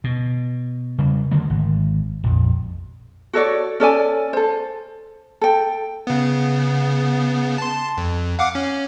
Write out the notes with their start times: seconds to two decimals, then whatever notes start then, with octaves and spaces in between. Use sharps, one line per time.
0.04 B2
0.98 C#3 G3
1.31 D3 D#3 F#3 A3
1.50 G#1
2.24 A#1 F2
3.33 F#4 A4 C#5 D5
3.80 C#4 A4 D5 G#5
4.33 A4 C5
5.41 A4 G5
6.07 C#3 B3
7.58 A5 C6
7.97 F2
8.39 F5 F#5 D6
8.55 C#4